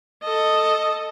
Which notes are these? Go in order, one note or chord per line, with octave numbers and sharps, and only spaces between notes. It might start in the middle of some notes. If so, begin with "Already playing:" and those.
A4 D#5